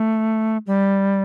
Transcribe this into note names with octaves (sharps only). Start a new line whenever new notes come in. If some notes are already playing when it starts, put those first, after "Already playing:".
Already playing: A3
G3